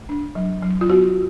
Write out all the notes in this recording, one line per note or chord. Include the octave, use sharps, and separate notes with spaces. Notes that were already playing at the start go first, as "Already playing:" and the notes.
Already playing: A3
D4
F#3
F#3
F4
B3 F#4